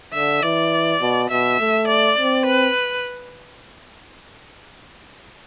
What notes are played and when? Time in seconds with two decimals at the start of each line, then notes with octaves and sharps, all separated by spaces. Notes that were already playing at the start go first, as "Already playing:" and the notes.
0.14 D3 E5
0.42 E3 D5
1.01 B2
1.30 B2 E5
1.60 A3
1.88 D5
2.17 C4
2.46 B4